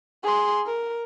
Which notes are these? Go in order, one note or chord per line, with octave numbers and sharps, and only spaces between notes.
G#4 C6
A#4